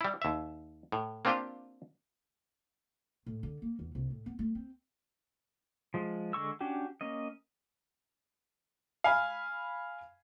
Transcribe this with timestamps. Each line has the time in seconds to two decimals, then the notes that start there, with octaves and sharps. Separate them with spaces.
0.01 G3 E4
0.22 D#2 E5
0.92 A2
1.25 A#3 C4 D4 F4 G4 G5
3.26 A2
3.43 D3
3.62 A#3
3.79 E2
3.95 C2
4.10 A2
4.26 B3
4.39 A3
4.55 C4
5.94 F3 G#3
6.33 D3 G#3 C#6 E6
6.61 C#4 D4 F#4 G4
7.01 A#3 C#4 D#5
9.04 F5 G#5 B5